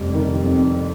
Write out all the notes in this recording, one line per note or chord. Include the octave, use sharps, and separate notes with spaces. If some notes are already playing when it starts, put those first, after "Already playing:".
Already playing: F1 F2 G3
D#3
F2